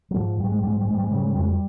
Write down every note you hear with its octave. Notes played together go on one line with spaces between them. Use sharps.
F#3
G#2 F3
G#2 G3
G#3
G3
G#2 G#3
G3
G#2 G#3
G3
G#3
C#3 G3
G#3
G3
F2 G#3
G3